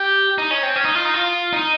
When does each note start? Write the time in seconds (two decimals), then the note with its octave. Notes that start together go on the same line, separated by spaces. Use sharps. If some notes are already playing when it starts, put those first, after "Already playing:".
Already playing: G4
0.38 D#4
0.51 C#4
0.63 C4
0.76 C#4
0.85 D#4
0.95 F4
1.05 D#4
1.14 F4
1.53 D#4